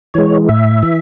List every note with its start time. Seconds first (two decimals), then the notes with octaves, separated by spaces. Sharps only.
0.14 E3 G#3 C#5
0.49 A2 E5
0.83 E3